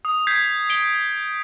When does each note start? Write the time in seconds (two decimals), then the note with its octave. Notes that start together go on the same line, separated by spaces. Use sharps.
0.05 D#6
0.27 G6 G#6 B6 C7
0.70 D7 G7